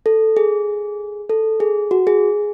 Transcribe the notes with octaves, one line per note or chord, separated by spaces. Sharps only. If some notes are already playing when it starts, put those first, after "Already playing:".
A4
G#4
A4
G#4
F#4
G#4